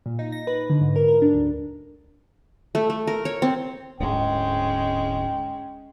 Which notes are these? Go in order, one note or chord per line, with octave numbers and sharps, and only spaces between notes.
A#2
D#4
A#6
B4
D3
G#2
A#4
A#4
D4
D2
A3
A3
A#4
C#5
C4
D1 G#2 G#3 C#4 G5